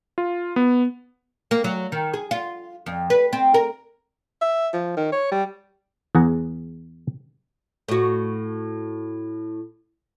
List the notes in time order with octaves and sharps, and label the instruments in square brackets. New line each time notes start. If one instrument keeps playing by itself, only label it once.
[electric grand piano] F4
B3
[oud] A#3
F#3
D#3
G#4
F4
F2
B4
C4
A#4
[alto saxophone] E5
F3
D#3
C#5
G3
[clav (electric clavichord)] E2 G#4 F#5 A#5
[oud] A2 F#4